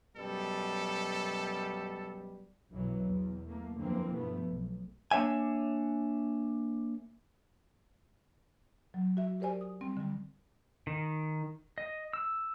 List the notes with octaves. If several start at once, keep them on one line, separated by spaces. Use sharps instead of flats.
F#2 B2 G3 A4
B1 F#2 B2 E3 F#3
E2
A3 A#3
F#2 D3 E3 F3 A#3 C4
G2 B2 F3 A3 B3
B1
A#3 D4 C#5 E5 G#5
F#3
F#4 E5
G4 A#4 C5 D5 G#5
D#6
G3 C4
D3 G3
D#3
D#5
E6